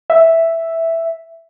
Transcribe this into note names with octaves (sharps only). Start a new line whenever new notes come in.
E5